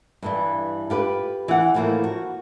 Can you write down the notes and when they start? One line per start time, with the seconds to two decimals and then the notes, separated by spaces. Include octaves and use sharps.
0.22 G2 E3 G3
0.90 F4 G4 B4
1.48 E3 F#5
1.74 A2 E3 F3 G3 A#3
2.04 F#4